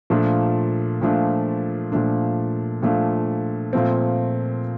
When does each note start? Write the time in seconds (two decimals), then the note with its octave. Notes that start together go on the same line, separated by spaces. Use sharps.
0.10 A#2 F3 A3 D4
1.01 A#2 F3 A3 D4
1.92 A#2 F3 A3 D4
2.82 A#2 F3 A3 D4
3.73 A#2 F3 A3 C4